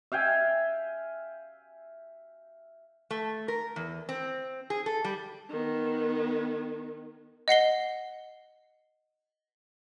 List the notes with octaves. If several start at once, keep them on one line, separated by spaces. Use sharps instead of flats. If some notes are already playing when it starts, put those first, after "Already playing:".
E5 F5 G5 G#5
A3
A#4
E2
C4
G#4
A4
G3
D#3 B3
D#5 F#5 C7 G7